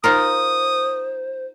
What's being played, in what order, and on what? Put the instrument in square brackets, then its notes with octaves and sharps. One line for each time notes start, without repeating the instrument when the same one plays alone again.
[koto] D#4 F4 A#4 [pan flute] C5 [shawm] D#6